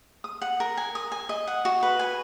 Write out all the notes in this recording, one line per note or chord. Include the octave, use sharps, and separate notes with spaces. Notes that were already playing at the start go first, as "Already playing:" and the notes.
D#6
F#5
A#4
G#5
D#6
G#5
D#5
F#5
F#4
B4
G#5